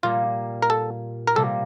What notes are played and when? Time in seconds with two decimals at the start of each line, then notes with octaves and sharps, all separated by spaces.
0.03 A#2 G3 A#3 F4
0.62 A#4
0.70 A4
1.27 A#4
1.35 C3 G3 A#3 A4